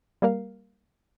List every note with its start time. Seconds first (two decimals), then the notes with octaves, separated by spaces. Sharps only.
0.22 G3 A#3 A#4 F5